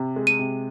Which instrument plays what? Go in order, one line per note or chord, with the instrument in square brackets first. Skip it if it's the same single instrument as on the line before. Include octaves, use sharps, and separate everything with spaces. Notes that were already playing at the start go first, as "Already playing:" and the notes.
Already playing: [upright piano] C3
G#3
[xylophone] D#7
[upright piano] C3